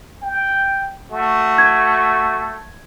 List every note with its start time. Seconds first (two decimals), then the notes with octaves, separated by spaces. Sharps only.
0.23 G5
1.12 A3 F#4
1.58 G#6